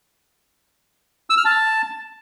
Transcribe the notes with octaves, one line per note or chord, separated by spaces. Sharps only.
E6
F6
A5